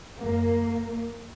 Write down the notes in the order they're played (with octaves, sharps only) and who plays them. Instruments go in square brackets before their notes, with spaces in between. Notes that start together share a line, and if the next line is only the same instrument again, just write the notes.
[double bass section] F#2 A#3